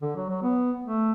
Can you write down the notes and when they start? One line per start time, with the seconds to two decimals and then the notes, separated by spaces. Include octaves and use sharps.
0.02 D3
0.15 F#3
0.29 F#3
0.43 B3
0.84 A3